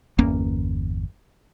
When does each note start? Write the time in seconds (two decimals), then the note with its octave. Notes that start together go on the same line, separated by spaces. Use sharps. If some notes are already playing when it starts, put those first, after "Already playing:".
0.19 G1 E2 A#3 C#4